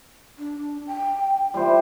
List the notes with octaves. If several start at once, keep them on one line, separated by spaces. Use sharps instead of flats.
D4
G5
G3 E4 F4 C5